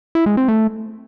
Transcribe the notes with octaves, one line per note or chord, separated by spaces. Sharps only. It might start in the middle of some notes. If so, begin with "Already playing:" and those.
E4
G#3
C4
A3